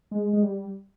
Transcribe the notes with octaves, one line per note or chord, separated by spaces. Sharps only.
G#3
G#3
G3